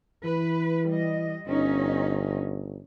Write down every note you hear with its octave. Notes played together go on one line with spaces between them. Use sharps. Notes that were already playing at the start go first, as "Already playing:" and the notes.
E3 B4
G3 D#5
G1 C#4 D#4